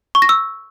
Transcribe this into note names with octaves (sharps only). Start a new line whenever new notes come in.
C#6
A#6
E6